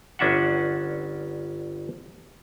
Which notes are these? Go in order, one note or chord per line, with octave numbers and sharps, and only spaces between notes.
G1 C#4 D4 E5 F#5